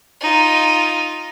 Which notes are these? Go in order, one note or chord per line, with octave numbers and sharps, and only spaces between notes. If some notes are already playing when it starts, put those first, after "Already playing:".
D#4 F4